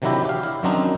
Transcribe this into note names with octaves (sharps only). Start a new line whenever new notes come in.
C3 D#3 F#3 D4 E4 G4
G4 F5
E4
F#2 D#3 F#3 C4 D4 D#4